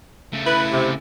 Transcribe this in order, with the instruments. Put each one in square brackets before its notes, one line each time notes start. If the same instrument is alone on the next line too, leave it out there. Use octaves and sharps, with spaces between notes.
[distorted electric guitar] C#3 A3
[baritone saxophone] E4 [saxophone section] B4
[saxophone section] C3